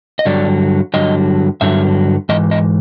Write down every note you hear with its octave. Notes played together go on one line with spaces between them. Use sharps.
D#5
G2 D3 F#3 D5
G2 D3 F#3 D#5
G2 D3 F#3 E5
G#2 E3 D#5
D#5